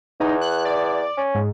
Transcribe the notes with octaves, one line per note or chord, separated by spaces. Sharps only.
E2 D#4
F#6
D5
C#4
G#2